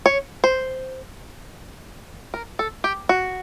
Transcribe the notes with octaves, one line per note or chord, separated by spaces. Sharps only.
C#5
C5
A#4
A4
G4
F#4